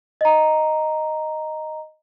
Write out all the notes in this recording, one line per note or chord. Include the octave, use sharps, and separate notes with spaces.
D#5 A#5